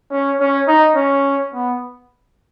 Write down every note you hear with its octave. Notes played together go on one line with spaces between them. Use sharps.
C#4
C#4
D#4
C#4
B3